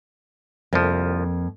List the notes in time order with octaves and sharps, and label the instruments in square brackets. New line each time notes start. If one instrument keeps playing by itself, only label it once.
[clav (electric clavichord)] C2 F3 [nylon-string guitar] F2 A#3